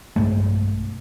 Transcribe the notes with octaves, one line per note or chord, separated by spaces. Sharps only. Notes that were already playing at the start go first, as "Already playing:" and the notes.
B1 G2 G#3 A3